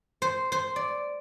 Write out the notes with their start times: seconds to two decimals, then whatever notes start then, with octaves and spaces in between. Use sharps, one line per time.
0.22 C5
0.52 C5
0.76 D5